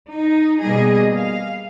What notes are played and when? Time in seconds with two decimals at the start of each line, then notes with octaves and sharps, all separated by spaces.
0.11 D#4
0.62 B2 G3 A#3 G#4 D#5
1.15 F5